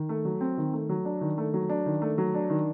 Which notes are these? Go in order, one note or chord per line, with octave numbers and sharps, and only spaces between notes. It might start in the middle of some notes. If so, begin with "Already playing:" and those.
Already playing: D#3
A3
F#3
C4
D#3
A3
F#3
D4
D#3
A3
F#3
D4
D#3
A3
F#3
D4
D#3